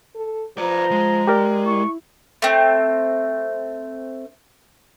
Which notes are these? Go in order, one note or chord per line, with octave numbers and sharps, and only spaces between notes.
A4
F3 B4 D5 A#5
G#3
G4 A#4 D5
E4 C#6
A3 C4